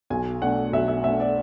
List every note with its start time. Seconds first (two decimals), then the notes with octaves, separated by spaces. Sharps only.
0.10 B1 G#5
0.42 B2 A3 D4 F#5
0.73 B1 E5
0.88 E5
1.03 B2 A3 D4 E5
1.20 D5